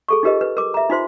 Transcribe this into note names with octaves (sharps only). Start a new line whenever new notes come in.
G#4 A4 C#6
D#4 F4 G4 A#4 B4 D#5
B4
A#4 D6
E5 A#5
D#4 F4 C5 C6